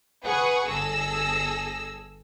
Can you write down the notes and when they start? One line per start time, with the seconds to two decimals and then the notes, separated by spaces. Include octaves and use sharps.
0.24 G#4 B4 F#5 C#6 D#6
0.68 G1 G#4 A4 E6 A#6